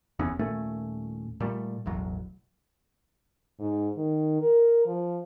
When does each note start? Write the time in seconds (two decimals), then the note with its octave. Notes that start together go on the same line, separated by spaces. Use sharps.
0.19 F1 E2 B3 C#4
0.39 D#1 A#2 A3 C#4
1.40 A#2 G3 A3
1.86 E1 A1 F#3
3.59 G#2
3.97 D#3
4.41 A#4
4.85 F3